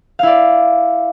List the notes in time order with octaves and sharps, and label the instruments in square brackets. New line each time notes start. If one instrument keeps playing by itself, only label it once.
[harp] F5
E4
D5